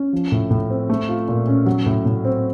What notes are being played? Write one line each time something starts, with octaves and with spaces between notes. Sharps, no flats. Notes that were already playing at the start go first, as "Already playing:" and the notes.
Already playing: C#4
F3
A2
A2
C4
A3
F4
A#2
C#4
F#3
A2
A2
C4